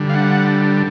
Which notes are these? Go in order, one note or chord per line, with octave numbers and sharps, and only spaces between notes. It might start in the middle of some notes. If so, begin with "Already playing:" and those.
Already playing: D3 G3
F5
F#5